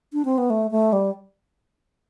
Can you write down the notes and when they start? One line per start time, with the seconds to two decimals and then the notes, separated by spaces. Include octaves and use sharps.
0.13 D4
0.25 C4
0.38 B3
0.50 A3
0.71 A3
0.93 G3